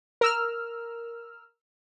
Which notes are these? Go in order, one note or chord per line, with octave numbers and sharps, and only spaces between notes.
A#4 E6 F6